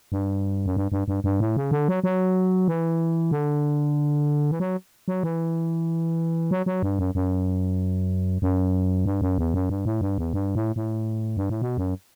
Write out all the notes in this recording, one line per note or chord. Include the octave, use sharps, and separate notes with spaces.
G2
F#2
G2
G2
G2
G2
A2
C#3
D3
F#3
F#3
E3
D3
E3
F#3
F#3
E3
F#3
F#3
G2
F#2
F#2
F#2
G2
F#2
E2
F#2
G2
A2
G2
E2
G2
A2
A2
G2
A2
B2
F#2